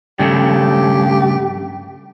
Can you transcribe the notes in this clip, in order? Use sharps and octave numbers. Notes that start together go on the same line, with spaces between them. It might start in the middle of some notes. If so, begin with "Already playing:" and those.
G2 C#3 A3 G4